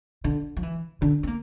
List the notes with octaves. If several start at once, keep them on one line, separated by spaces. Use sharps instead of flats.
D3
F3
E3
D3
C4
A#3